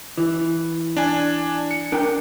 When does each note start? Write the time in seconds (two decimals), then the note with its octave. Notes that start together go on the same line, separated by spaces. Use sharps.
0.18 E3
0.97 D4 G#5
1.71 C#7
1.92 D4 A#4 G5